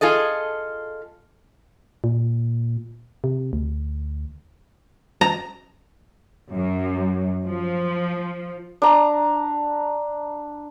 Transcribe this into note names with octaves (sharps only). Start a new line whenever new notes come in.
F4 G#4 A4 D#5
A#2
C3
D2
A#5
F#2
F3
D4 A#5